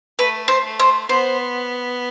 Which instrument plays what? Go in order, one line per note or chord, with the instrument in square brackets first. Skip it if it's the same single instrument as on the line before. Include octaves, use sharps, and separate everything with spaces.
[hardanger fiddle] A3 [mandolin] B4
[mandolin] C5
[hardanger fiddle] A3
[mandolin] C5
[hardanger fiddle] B3 [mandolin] C5